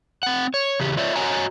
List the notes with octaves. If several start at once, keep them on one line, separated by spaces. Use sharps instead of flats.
C4 F#5
C#5
E2 C#3 G4
F4 C#5 D5 E5
F#4 C#5 D#5 F#5 G#5 A#5